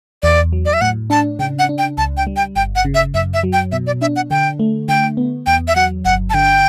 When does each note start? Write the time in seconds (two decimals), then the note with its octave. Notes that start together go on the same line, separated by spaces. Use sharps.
0.23 E2 D5
0.53 F#3
0.65 D5
0.73 E5
0.81 A2 F#5
1.10 D4 A5
1.39 C#3 G5
1.59 F#5
1.69 D4
1.78 G5
1.98 C#2 A5
2.17 G5
2.27 G3
2.36 G5
2.56 G1 G5
2.76 F#5
2.85 C#3
2.95 E5
3.14 F#2 E5
3.34 E5
3.43 F#3
3.53 G5
3.72 B2 E5
3.87 D5
4.01 D4 E5
4.16 F#5
4.31 D3 G5
4.59 A3
4.89 D3 G5
5.17 B3
5.46 E2 G5
5.68 E5
5.76 F#3 F#5
6.05 G1 F#5
6.30 A5
6.34 D3 G5